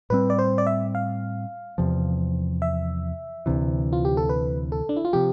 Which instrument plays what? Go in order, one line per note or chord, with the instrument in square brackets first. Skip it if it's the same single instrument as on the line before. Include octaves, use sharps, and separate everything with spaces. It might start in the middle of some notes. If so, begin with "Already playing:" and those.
[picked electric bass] A2 G3 C4 [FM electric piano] B4
[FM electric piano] D5
C5
D5
E5
F5
[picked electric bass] E2 C3 F3
[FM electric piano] E5
[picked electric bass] D2 C3 E3
[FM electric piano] F4
G4
A4
B4
A4
D4
E4
F4
[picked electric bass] C3 F3 [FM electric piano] G4